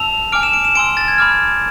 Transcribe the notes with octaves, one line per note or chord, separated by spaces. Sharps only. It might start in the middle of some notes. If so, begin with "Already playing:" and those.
Already playing: A5 E6 F7
G#5 D6 F6 D7
E7
D7
E7
G#5 C6 E6 D7
A6
G#6
B5 D6 F6